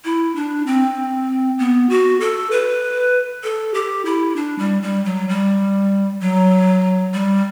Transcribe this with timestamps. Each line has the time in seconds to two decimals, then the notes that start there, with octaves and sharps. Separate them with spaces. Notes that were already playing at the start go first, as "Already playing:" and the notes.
0.05 E4
0.35 D4
0.66 C4
1.59 B3
1.89 F#4
2.20 A4
2.51 B4
3.43 A4
3.74 G4
4.05 E4
4.36 D4
4.59 G3
4.82 G3
5.05 F#3
5.29 G3
6.20 F#3
7.14 G3